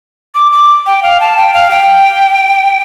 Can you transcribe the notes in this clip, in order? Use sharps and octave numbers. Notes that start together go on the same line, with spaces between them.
D6
D6
G5
F5
A5
G5
F5
G5